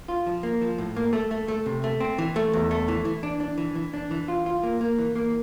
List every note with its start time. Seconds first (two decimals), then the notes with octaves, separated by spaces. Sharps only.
0.08 F4
0.27 F3
0.43 A#3
0.61 F3
0.78 A2
0.96 A#3
1.13 A3
1.31 A3
1.48 A3
1.66 C3
1.84 A3
2.00 C4
2.18 E3
2.36 A3
2.53 E2
2.71 A3
2.88 E3
3.05 E3
3.23 D4
3.40 D4
3.58 E3
3.75 E3
3.94 D4
4.11 E3
4.28 F4
4.46 F4
4.63 A#3
4.81 A#3
4.98 E3
5.16 A#3